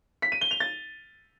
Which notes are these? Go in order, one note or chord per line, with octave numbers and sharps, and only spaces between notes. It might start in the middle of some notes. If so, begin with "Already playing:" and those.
B6
D#7
G7
F7
A6